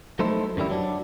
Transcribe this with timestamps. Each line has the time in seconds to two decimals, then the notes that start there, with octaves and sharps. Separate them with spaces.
0.19 F#3 A3 D#4 E4 A4 C5
0.57 F#2 D#3 G3 E4
0.69 F#3 D4